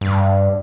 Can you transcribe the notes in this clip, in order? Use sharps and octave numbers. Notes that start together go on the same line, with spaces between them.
G2